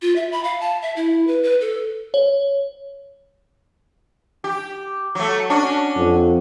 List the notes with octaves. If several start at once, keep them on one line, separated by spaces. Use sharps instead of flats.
F4
E5
B5
F5
A5
E5
E4
B4
B4
A4
C#5
G4
F#3 A3
C#4 D4 F#4
F2